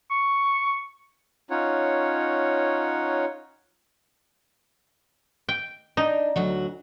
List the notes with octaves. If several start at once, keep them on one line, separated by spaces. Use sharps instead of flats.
C#6
C#4 D#4 F4 C#5 F#5
G5
D4 D#4
D2 F#3 F#4